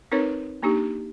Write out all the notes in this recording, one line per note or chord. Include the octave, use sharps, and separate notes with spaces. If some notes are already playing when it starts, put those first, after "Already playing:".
C4 D#4 A#4 B4 C#5
A#3 D4 D#4 G4